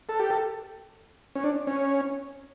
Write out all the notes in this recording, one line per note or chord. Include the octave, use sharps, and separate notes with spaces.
A4
G4
A4
C#4
D4
C#4